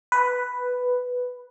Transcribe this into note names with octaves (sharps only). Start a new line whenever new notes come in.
B4